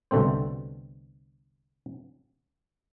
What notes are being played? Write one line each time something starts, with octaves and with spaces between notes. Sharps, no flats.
C2 B2 D3 A3 C4 C5